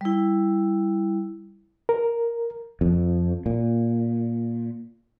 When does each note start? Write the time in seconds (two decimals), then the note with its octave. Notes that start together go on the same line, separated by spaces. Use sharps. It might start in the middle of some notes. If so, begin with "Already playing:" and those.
0.01 G3 E4
1.89 A#4
2.81 F2
3.46 A#2